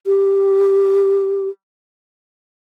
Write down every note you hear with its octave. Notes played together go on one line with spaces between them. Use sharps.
G4